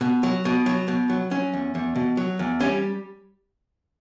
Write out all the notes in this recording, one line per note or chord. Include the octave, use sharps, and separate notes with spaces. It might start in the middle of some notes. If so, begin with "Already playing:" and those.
B2
F#3
B2
F#3
B2
F#3
F#3 C#4
E2
E2
B2
F#3
E2
G3 C#4